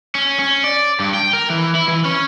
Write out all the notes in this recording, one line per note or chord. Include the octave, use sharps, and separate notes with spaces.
C#4
C#4
D5
G2
G5
A#4
E3
E4
E3
C#4